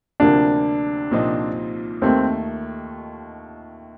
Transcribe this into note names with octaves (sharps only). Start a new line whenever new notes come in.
D2 C3 F3 A#3 D4
C2 A#2 F3 C4 D#4
D#2 D#3 A3 C4